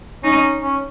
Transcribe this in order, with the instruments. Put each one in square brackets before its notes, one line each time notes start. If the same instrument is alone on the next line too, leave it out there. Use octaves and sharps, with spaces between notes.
[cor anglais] C#4 [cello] D#4
[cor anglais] C#4